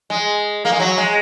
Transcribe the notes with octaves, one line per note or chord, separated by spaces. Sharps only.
G#3
A#3
G#3
F#3
G#3